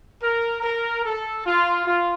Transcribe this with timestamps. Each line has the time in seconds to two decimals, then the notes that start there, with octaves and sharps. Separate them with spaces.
0.21 A#4
0.62 A#4
1.05 A4
1.44 F4
1.85 F4